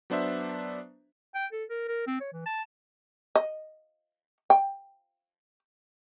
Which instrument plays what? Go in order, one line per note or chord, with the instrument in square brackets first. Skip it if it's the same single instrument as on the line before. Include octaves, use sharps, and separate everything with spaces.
[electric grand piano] F#3 B3 D4 C5 E5
[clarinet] G5
A4
A#4
A#4
C4
C#5
E3
A5
[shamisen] D#5
G5